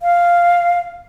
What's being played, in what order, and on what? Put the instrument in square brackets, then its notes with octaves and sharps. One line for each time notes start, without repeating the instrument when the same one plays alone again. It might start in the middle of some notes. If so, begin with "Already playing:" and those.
[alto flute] F5